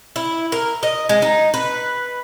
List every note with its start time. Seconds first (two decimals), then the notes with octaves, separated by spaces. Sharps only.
0.16 E4
0.52 A#4
0.83 D#5
1.09 G#3
1.22 D#4
1.54 B4